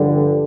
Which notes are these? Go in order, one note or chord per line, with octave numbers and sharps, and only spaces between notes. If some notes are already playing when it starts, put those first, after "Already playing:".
Already playing: G2 D3 F3